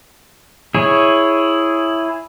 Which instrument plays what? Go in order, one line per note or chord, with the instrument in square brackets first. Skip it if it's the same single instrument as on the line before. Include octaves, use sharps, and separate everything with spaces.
[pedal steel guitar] E4 G#4 C#5